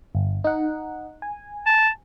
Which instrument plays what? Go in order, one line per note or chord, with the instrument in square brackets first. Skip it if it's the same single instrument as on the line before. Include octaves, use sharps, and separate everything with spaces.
[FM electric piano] G1
D#4 F#5
G#5
[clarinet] A5